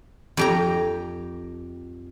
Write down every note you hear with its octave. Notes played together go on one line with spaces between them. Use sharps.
F2 G4 A#5